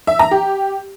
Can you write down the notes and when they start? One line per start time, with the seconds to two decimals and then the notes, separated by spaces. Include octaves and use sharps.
0.07 E5
0.19 A#5
0.31 G4